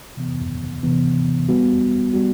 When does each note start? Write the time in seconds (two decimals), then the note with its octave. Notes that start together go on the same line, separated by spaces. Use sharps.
0.17 C3 E3 B3
0.83 C3 E3 B3
1.49 G3 B3 F#4
2.14 G3 B3 F#4